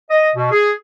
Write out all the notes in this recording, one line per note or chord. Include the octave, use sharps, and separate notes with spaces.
D#5
B2
G#4